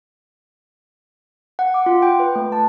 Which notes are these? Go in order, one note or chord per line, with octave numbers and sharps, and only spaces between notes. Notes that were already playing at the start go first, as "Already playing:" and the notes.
F#5
D6
F4
G5
B4
A3
A5